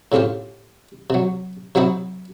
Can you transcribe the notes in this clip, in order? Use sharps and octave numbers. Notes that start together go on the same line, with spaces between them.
A2 C#3 C4 F4 G4
C3 F#3
C3 F#3 C4 D#4 E4